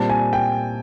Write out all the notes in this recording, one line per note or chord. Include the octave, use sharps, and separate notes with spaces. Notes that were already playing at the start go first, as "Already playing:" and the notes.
Already playing: A#2 G3 C4 A5
G#5
G5